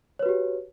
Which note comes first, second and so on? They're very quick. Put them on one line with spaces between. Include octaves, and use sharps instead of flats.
C#5 B4 F#4 G4